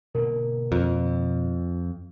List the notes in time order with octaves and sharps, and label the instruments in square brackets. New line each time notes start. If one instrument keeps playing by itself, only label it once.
[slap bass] B2 D3 A#3 [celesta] A#4
[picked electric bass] F2 [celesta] F4